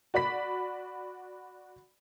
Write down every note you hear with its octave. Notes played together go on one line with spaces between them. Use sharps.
F#4 D5 B5 B6